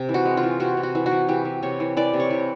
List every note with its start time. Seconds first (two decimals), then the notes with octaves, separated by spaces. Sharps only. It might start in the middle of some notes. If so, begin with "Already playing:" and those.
Already playing: C3
0.09 E3
0.14 F#4
0.25 G#3
0.37 F4
0.43 E3
0.60 C3 F#4
0.77 C3
0.83 F#4
0.95 E3
1.06 F#4
1.11 E3
1.29 E3 G4
1.45 E3
1.63 C3 C#5
1.80 E3
1.97 E3 D5
2.13 C3
2.20 C#5
2.30 E3